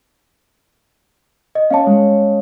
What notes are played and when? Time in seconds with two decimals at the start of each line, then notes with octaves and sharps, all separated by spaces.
1.55 D#5
1.70 C#4 C#5 F5 A5
1.86 G#3